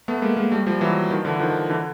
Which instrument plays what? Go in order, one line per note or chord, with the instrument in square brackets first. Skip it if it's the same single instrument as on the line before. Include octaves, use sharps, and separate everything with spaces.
[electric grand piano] A3 B3
G#3 A#3
G#3 A#3
G3 A3
F3 G3
E3 F#3
D#3 F3
D3 E3
D#3 F3
D3 E3